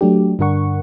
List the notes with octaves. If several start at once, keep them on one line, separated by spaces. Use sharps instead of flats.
F#3 A3 D4 G4
G2 D3 D4 A#4 F#5 C#6